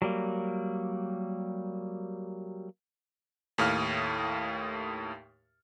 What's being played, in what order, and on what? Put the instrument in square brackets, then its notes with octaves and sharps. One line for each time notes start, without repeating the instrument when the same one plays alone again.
[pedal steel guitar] F#3 G3 A#3
[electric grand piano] D#2 A2 F5 F6